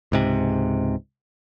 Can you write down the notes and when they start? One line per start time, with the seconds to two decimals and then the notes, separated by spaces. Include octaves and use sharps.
0.12 C#2 G#2 C3